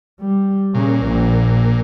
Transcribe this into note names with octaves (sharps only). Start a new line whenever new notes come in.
G3
A#2 C#3
A#1